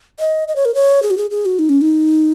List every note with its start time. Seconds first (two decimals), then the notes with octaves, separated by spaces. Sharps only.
0.19 D#5
0.48 D#5
0.56 C#5
0.65 A#4
0.75 C#5
1.03 G#4
1.11 F#4
1.18 G#4
1.31 G#4
1.46 F#4
1.59 D#4
1.69 C#4
1.81 D#4